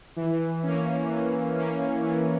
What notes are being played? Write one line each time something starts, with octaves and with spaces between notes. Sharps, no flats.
E3
A#3 C#4
E3
A#3 C#4
E3